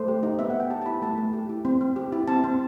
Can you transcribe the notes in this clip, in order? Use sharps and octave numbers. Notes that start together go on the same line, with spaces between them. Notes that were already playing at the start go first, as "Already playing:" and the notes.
Already playing: A3 C5
G4
D#4
B3 E5
F#5
B3 G5
G4 A5
A5
E4 B5
A3 A5
A3
G4
E4
C4
C4
G4
E4
C4 A5
C4